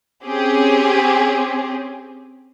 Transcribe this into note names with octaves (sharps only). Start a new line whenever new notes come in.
C4 C#4 G4 G#4